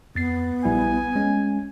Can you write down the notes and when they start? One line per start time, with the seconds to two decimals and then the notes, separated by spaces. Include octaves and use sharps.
0.15 F2 B3 A6 C7
0.65 A#1 G3 E4 G#5
1.15 G#3 C#4